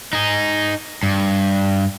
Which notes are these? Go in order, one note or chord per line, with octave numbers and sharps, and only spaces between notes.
D#4 G#4
G2